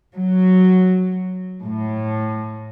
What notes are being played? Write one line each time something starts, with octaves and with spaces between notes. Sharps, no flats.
F#3
A2